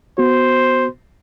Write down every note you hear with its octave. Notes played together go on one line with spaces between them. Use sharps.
B3 F#4 C5